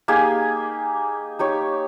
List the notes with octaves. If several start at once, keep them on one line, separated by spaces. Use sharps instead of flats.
A#3 D#4 G4 G#4
D#4 G4 C#5